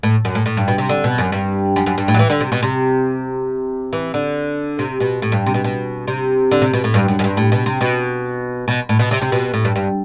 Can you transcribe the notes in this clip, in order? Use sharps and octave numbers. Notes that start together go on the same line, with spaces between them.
A2
F#2
A2
A2
G2
B2
C3
D3
B2
F#2
G2
F#2
F#2
G2
A2
F#3
E3
D3
C3
B2
C3
E3
D3
C3
B2
A2
G2
C3
B2
B2
C3
D3
C3
B2
A2
G2
F#2
F#2
G2
A2
B2
C3
B2
B2
A2
B2
C3
C3
B2
A2
G2
G2